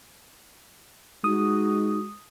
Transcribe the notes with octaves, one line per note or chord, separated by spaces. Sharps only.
G#3 D#4 F#4 D#6